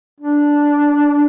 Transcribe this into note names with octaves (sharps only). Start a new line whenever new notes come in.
D4